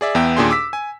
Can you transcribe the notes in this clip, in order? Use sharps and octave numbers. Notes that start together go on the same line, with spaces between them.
G#4 D5 E5
E2 B3 E5 G5
D#2 A#2 D4 G#4 G5 C6
D6 E6 B6
G#5